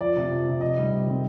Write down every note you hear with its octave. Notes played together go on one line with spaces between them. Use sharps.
F2 D5
C3 F3
F2
C3 F3
C3 D#5
D#3 G3 C4
C3
D#3 G3 C4